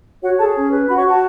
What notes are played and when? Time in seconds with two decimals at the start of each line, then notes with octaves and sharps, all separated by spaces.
0.22 F#4 C#5 F#5
0.38 G#4 A4 A5
0.55 C#4
0.71 B4
0.88 F#4 B5
0.96 C#5 C#6
1.05 F#4 A5